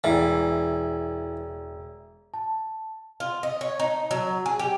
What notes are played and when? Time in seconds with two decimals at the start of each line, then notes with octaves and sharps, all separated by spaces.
0.04 E1 E3 D5 E5
2.34 A5
3.20 F4
3.43 D#5
3.61 C#5
3.80 D#4
4.11 F#3
4.46 G#4
4.59 G4